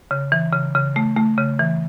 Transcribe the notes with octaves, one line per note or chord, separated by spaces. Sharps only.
C#3
E3
C#3
C#3
A3
A3
C#3
E3